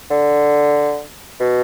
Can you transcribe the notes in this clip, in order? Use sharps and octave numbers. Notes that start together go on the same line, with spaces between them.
D3
B2